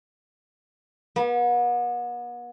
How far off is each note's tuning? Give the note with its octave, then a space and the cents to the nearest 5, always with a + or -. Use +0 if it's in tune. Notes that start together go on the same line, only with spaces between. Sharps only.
B3 -40